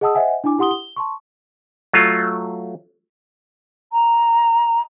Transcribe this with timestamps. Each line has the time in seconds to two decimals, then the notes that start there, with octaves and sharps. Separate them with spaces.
0.01 G#4 D#5 F#5 A5 D#6 E6
0.15 C5 D#5 E5 F#5 G#5
0.44 D4 E4 G#5 D6
0.58 E4 G4 F#5 C6 D#6 G7
0.71 G7
0.96 A5 C6 C#6
1.93 F#3 A3 F4
3.92 A#5